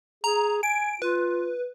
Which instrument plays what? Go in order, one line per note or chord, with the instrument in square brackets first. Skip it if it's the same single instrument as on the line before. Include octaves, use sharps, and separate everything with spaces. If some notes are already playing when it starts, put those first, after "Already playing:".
[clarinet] G#4 [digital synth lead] A#5
[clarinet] G#5 [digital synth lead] D7
[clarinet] F4 [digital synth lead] B4